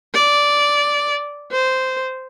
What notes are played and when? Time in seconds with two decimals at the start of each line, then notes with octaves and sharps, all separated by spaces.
0.14 D5
1.52 C5